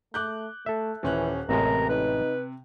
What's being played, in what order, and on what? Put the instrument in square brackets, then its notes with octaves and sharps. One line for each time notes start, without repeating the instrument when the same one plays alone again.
[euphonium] A3 [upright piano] D6 F#6 G6
[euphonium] A3 [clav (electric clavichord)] A4 E5
[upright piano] D#1 C#4 F#6 [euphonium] E3
[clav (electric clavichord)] A1 A2 G#3 [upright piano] C3 [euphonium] A#4 [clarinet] A#5
[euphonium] D#4 [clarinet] B4